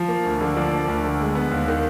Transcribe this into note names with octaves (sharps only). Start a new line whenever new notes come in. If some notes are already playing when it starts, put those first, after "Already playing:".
Already playing: F3
A#3
D2
D3
F3 D5
A#3
D2
D3
G#3
B3
D#2
D#3